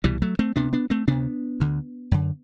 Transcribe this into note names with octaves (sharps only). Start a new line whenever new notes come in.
C2 B2 E3 G3
F#3 A3
A3 C4
D2 C3 B3 D4
B3 D4
A3 C4
D2 C3 B3 D4
D2 D3
F#2 D3